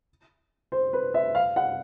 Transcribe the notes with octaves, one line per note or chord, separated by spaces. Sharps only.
C5
B4
E5
F5
F#5